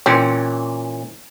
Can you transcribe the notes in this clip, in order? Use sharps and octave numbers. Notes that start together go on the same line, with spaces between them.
A#2 E3 C4 C#4